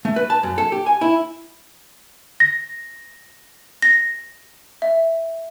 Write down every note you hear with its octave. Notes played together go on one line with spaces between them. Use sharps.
A3
B4
A5
F#2
A4
G4
G#5
E4
A#6
A#6
E5